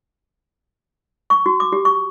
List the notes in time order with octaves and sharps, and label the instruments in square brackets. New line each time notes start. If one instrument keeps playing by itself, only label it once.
[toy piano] C#6
F#4
D6
G4
C#6